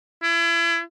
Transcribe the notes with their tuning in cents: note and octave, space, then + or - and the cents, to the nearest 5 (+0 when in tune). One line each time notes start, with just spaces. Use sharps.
E4 +35